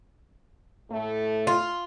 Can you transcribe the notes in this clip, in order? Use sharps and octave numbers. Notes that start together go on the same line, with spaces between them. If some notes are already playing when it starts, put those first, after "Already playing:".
A2 A3
F4